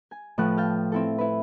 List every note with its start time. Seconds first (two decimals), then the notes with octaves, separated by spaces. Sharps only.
0.11 G#5
0.38 A2 F3 B4 F#6
0.58 F5 G5 A5
0.92 C4 E4 A4
1.18 E4 B4